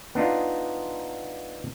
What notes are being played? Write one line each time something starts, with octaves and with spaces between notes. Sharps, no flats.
B3 D4 D#4 F4